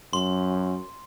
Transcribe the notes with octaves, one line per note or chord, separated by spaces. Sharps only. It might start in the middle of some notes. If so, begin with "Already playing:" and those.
F#2 C6